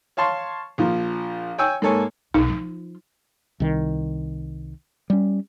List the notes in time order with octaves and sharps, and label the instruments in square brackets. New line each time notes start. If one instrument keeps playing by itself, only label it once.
[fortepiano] C#5 F5 A5 C6 C#6
A#1 F3
C#5 G5 G#5 E6
G#2 A#3 A4 C#5 G#5
[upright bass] B1 [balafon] D#4
[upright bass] F3 F4
[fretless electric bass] C2 D#3
G3 C#4